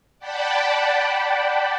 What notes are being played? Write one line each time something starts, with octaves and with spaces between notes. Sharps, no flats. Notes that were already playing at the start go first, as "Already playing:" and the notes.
D5 F#5 G5 A5 B5